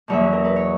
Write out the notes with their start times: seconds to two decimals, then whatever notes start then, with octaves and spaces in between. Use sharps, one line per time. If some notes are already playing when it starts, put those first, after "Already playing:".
0.08 E2 B2 F#3 A#3 C#4 C#5 E5
0.33 A#4
0.44 B4
0.56 C#5